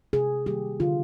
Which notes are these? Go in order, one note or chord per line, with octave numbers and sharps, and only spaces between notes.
C3 G#4
D#3 G3 A#3 G4
D3 F4